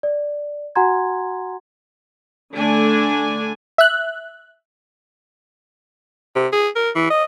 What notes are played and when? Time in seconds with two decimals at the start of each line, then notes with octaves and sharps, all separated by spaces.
0.03 D5
0.75 F#4 F#5 G#5 A#5 C6 G#6
2.55 D3 A3 D4 G#5
3.78 E5 F#6
6.36 C3
6.53 G#4
6.76 A#4
6.95 E3
7.10 D#5